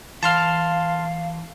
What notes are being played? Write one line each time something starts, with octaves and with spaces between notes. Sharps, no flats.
E3 F5 A5 C6 F6